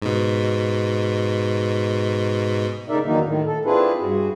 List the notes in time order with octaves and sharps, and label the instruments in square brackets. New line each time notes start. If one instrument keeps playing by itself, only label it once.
[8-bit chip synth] G#2 B2
[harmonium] A2 C#3 D#4 A#4 D5 E5
E2 D3 D#3 F#3 A#3 D#4
A2 D#3
A4
C4 D4 E4 F4 G#4 B4
G2 F#4 G#4